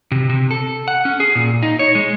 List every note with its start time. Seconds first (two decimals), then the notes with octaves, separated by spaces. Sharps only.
0.12 C3
0.29 C3
0.51 A4
0.88 F#5
1.05 C#4
1.20 G#4
1.35 A#2
1.63 D#4
1.79 C#5
1.95 G#3